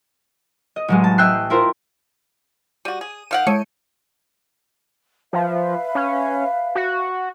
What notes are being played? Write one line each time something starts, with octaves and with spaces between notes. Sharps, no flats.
D#5
A1 F#3 G#3
A5
D#5 E5 G5 E6 F#6 C7
E4 F4 A#4 C5
G3 F#4 D#7
G#4
D#3 F5 F#5 G6 D7
G#3 E4 A4 C#5 C#7 D#7
F3 B4 E5 F5
C#4
F#4